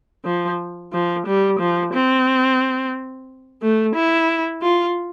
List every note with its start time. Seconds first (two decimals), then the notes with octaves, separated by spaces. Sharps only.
0.25 F3
0.93 F3
1.26 G3
1.60 F3
1.93 C4
3.62 A3
3.95 E4
4.62 F4